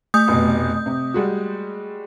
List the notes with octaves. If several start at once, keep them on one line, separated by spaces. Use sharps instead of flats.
A3 D#6 G6
F1 B2
C3
G3 G#3 F#4